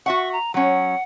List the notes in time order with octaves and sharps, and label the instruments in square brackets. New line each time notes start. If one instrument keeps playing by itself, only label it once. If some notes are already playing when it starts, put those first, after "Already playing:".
[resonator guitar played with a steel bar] F#4 E5 F#5 [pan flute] C#6
[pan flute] A#5
[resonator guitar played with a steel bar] F#3 C#4 [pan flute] F#5